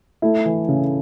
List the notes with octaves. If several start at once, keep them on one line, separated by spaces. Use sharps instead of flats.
A3 E4
E3
C#3